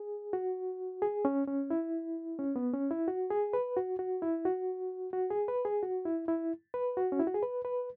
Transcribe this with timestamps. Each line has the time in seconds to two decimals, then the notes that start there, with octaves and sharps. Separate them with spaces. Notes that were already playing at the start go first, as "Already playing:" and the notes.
Already playing: G#4
0.33 F#4
1.02 G#4
1.25 C#4
1.47 C#4
1.70 E4
2.39 C#4
2.56 B3
2.73 C#4
2.91 E4
3.08 F#4
3.31 G#4
3.53 B4
3.77 F#4
3.99 F#4
4.22 E4
4.45 F#4
5.13 F#4
5.31 G#4
5.48 B4
5.65 G#4
5.83 F#4
6.05 E4
6.28 E4
6.74 B4
6.97 F#4
7.12 C#4
7.20 E4
7.27 F#4
7.34 G#4
7.43 B4
7.65 B4